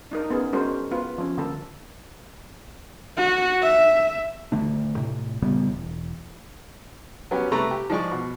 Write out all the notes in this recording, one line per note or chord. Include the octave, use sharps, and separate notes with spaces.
D4 D#4 A#4
B3 C#4 G#4
G#3 C#4 D4 F#4 A#4 C5
B3 F4 B4
F3 C#4
D3 A#3 A4
F#4
E5
D#1 D3 A3 D4
A2 C3
A#2 C#3 G3 B3
E1
F#3 B3 C#4 G4
C3 A3 B4 A#5 C#6
G4
F3 G#3 D5 C#6
B2